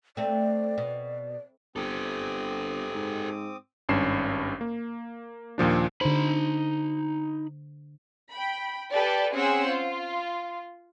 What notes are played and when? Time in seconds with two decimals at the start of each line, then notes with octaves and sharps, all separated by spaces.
0.17 A3 C4 D5
0.78 B2
1.76 G1 C4 G4 A4 D6 D#6
2.94 G#2
3.89 G#1 G2 C#4 C7 E7
4.61 A#3
5.58 D#2 A#2 F3 D4
6.01 D3 D#4 C5 B5
8.31 G5 B5
8.91 G4 A4 B4 D5
9.32 C4 C#4 G#4 C5 F#5 E6
9.68 F4